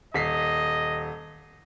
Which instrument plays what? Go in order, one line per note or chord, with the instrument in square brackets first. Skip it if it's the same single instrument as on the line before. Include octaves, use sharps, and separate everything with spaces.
[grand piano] D#1 B6 C7 [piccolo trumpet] D#5